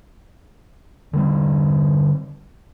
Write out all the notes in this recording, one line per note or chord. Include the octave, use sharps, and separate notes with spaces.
D3 G3 C4